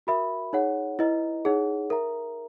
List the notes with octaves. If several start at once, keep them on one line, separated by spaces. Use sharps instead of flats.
F#4 A#4 E5 B5
D#4 G#4 C#5 F#5
E4 B4 D#5 A#5
D#4 G#4 C#5 F#5
A#4 E5 A#5